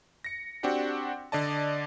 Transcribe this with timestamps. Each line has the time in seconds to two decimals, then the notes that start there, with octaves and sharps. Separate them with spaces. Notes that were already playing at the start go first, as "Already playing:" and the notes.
0.24 A#6 C#7
0.63 C4 D4 F#4 G4 F#5
1.32 D3 D5 D#5 A5